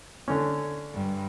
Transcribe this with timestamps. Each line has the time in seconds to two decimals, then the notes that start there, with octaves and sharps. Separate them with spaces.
0.28 D3 C#4
0.94 G2